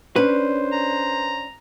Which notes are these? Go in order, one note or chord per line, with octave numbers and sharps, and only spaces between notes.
C#4 D4 B4 C5
A#5